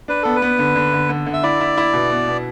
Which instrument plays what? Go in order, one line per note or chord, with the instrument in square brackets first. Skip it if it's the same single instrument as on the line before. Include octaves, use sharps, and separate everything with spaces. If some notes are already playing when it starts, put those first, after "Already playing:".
[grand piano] D4 [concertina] B4
[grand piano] B3 [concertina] A4
[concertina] B4
[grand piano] B3
D3
D3
D3
D3
D3
[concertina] E5
[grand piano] E4 [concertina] D5
[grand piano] E4
E4
B2
B3
B2